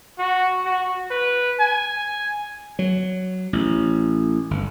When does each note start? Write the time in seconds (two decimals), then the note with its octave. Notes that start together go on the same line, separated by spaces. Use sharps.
0.19 F#4
0.65 F#4
1.11 B4
1.60 G#5
2.79 F#3
3.53 A1
4.51 G1